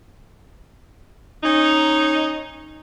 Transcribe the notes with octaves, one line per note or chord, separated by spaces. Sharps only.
C#4 D#4